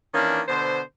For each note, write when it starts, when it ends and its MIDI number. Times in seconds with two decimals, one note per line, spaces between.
0.14 0.42 51
0.14 0.42 52
0.14 0.42 58
0.14 0.42 61
0.14 0.42 62
0.48 0.82 47
0.48 0.82 50
0.48 0.82 72